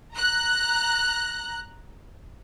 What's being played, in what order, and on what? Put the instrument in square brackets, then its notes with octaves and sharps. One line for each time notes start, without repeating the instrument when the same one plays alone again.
[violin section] A#5 F#6